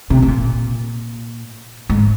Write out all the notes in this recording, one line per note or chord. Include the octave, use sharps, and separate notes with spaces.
C3
C3
A#2
G#2